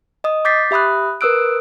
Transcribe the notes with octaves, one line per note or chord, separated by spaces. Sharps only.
D#5 D#6
D6 G6 A6 B6 C7
G4 E5 B5 D#6 F#6
A#4 B4 D#6 E6 F#6 D7